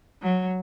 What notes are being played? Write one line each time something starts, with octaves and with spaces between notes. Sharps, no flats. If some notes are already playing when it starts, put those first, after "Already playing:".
F#3